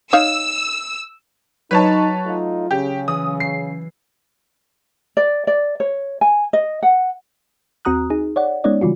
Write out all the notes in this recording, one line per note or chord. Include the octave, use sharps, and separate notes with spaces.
D#4 C#5 F5 E6
F#3 D#4 B4 C#5 A5
A3 D#4 F4
C#3 G4
E3 D#6
C7
D5
D5
C#5
G#5
D#5
F#5
D#2 C4 F#4 A#5 D#6 F#6
D#4 G#4
C#5 D5 F#5
G#3 B3 C#4 D#4 C#5 D5
C#3 E3 G3 F4 F#4